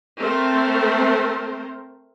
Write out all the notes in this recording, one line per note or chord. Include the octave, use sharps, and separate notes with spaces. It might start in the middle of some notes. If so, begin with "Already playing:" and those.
A3 C4 A#4 C5